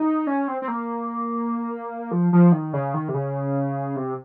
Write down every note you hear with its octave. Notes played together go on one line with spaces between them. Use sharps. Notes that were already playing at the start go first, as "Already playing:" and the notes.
Already playing: D#4
C#4
C4
C4
A#3
F3
F3
D#3
C#3
D#3
C3
C#3
C3